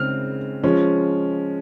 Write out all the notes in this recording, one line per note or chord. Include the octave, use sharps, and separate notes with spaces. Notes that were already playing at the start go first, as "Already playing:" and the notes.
Already playing: C#3 G#3 C4 F6
F3 G#3 C#4